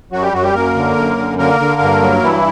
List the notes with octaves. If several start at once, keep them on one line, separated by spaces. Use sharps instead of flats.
F#2 F#3 F#4
G3 G4
F#2 F#3 F#4
G3 G4
F#2 A#3 A#4
D3
F#2
D3
D3 A#3 A#4
D3
G2
F#3
G2 E3 E4